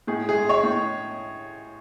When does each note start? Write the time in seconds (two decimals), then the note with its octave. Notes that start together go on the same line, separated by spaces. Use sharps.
0.07 A2 G#4
0.29 G#4
0.35 G#3
0.49 C#5
0.63 A2